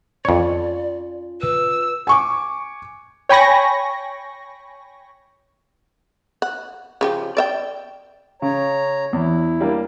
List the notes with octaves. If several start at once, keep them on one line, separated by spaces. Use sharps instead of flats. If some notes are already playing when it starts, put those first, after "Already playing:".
F2 C#4 F4 C#5 D5
B4 E6
G#5 C#6 D6
C#5 G5 G#5 B5 C#6 A#6
F#5
C#3 F3 G4
D5 E5 G5
C#3 C#5 A#5
E2 E4
G3 A#3 D4